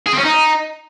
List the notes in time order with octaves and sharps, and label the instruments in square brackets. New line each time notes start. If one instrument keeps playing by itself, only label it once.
[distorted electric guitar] G#4
C4
C#4
D#4